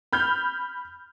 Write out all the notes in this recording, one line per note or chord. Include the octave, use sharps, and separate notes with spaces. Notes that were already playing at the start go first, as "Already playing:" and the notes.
B5 F6 G6